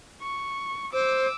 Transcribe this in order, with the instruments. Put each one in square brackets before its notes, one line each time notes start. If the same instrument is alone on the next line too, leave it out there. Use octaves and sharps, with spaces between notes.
[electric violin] C#6
[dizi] C5 [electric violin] D6 E6